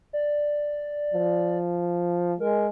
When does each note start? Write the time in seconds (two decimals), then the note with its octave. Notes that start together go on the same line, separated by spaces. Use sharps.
0.13 D5
1.13 F3
2.40 G#3 A#4